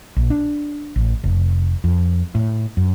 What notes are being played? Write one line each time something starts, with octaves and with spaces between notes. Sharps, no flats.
A#1
D4
A1
F1
F2
A2
F#2